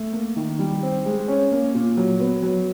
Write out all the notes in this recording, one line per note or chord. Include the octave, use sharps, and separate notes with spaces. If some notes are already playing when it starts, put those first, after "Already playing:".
Already playing: A3
A#3
D#3
G3
C4
G#3
C#4
A#3
A#2
F#3
B3
F#3